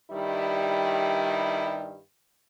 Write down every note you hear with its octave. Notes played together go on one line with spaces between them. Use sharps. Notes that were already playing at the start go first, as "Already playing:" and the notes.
G2 D#3 G3 E4